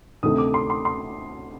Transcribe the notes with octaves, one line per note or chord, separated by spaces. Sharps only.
D2 C3 D#3 A3 D#6
D6
C6
C6
C6